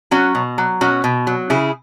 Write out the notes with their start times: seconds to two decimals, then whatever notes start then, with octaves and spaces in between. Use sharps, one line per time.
0.11 F#3 C#4 F#4
0.35 B2
0.58 F#3
0.81 B2 C#4 F#4
1.04 B2
1.27 F#3
1.50 C#3 E4 G#4